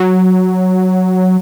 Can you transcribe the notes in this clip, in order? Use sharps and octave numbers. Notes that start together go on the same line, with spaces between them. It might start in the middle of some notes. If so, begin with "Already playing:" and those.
Already playing: F#3